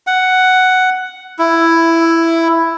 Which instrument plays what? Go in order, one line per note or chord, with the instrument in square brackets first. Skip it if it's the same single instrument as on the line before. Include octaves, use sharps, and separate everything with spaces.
[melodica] F#5
E4